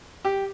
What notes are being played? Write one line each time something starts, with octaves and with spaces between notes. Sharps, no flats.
G4